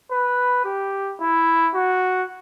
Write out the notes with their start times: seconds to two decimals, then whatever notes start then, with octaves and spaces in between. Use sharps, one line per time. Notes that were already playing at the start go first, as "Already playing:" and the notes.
0.11 B4
0.65 G4
1.20 E4
1.75 F#4